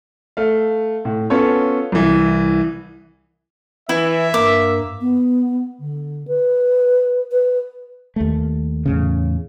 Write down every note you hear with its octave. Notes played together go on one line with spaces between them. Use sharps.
A3 F5
A2
B3 C#4 F4 A4 C#5
C2 E3
E3 E4 E5
G2 A#3 D6
B3
D3
B4
B4
D#2 A3
E2 A2 C#3